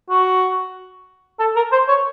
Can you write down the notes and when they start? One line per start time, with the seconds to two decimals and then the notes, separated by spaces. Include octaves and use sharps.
0.10 F#4
1.39 A4
1.56 A#4
1.72 C5
1.88 C#5